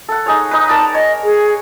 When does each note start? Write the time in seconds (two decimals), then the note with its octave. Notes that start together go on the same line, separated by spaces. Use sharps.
0.09 A4 F#5
0.26 D#4 G#4 C#5
0.51 D#4 B4
0.69 A#4 D5 A5
0.94 C#5 D#5
1.24 G#4